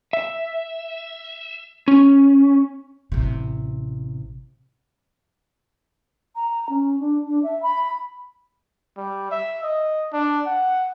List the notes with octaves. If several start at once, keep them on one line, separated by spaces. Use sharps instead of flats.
E5
C#4
A1 C3
A#5
C#4
D4
D4
E5
B5
G3
E5
D#5
D4
F#5